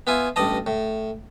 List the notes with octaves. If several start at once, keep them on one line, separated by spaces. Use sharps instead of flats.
B3 E4 F4 G#5
A1 G2 D5 D#5 A5
A2